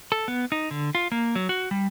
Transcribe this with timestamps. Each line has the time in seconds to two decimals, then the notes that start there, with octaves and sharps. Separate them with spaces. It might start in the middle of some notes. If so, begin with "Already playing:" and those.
0.12 A4
0.28 B3
0.52 D#4
0.71 D3
0.95 F4
1.12 A#3
1.35 F#3
1.49 F#4
1.71 G3